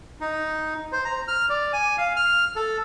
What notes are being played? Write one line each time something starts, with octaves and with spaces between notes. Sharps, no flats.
D#4
C5
A#5
F6
D5
G#5
F5
F6
A4